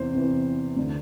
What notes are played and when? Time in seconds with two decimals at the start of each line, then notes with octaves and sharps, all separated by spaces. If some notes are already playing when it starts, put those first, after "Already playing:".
Already playing: E2 C3 E3 C5
0.14 E2 C3 E3
0.76 D2 D3